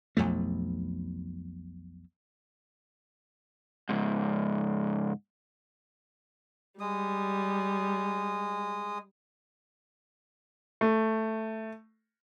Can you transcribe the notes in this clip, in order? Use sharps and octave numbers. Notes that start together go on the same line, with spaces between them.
B1 F2 B2 A3
C#2 G#2
G3 G#3 D#6
A3